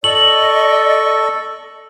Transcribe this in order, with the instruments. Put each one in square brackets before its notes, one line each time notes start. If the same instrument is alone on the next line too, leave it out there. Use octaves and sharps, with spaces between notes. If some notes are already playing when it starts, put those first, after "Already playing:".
[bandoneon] A4 C#6 [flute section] D5 D#5 [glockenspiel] F#7